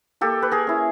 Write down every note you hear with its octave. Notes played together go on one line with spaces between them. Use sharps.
A#3 G4 A4
B4
G#4 A#4
C#4 E4